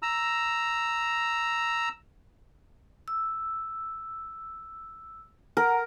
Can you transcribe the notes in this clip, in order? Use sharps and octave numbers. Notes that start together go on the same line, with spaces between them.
A#5 E6
E6
A#4 F#5 A#5